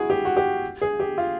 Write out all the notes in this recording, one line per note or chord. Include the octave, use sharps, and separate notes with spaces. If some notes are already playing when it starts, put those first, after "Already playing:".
Already playing: E4 F#4 G#4
G4
F#4
G4
G#4
G4
F4